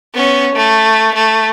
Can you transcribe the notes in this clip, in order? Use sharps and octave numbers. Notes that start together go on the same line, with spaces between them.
B3 C#4
A3
A3